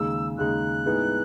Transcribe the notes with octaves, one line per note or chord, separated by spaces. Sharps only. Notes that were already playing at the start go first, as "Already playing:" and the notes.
Already playing: D#2 C#3 G#3 D#4 E6
D#2 C#3 G#3 D#4 F#6
A2 G#3 B3 D#4 G#4